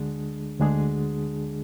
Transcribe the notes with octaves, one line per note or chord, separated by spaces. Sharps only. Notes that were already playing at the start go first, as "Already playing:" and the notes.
Already playing: D2 D3 G#3 D4 G#4
D2 D3 G#3 D4 G#4